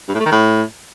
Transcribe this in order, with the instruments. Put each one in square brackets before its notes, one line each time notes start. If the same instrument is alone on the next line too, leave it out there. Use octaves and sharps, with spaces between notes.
[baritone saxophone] G2
A2
A3
D#3
A2